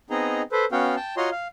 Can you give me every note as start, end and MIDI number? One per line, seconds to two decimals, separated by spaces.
0.10 0.42 59
0.10 0.42 60
0.10 0.42 63
0.10 0.42 68
0.10 0.42 75
0.10 0.42 82
0.52 0.65 69
0.52 0.65 71
0.52 0.65 72
0.72 0.96 59
0.72 0.96 61
0.72 0.96 66
0.72 0.96 77
0.72 0.96 79
0.96 1.15 79
0.96 1.15 81
1.17 1.30 65
1.17 1.30 66
1.17 1.30 73
1.17 1.30 75
1.17 1.30 82
1.17 1.30 84
1.31 1.47 77